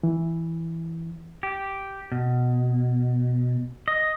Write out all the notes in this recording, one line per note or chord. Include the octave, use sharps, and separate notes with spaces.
E3
G4
B2
D#5